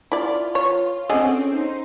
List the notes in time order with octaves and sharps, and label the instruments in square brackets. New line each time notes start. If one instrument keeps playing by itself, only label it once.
[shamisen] E4 D5 [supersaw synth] F4
[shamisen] C#5
[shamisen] D3 G#4 D#5 [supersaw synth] C4 C#4
[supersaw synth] D#4 C5